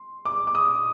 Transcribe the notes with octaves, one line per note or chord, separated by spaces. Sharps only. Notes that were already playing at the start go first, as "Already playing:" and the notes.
Already playing: C6
D6
D6
D#6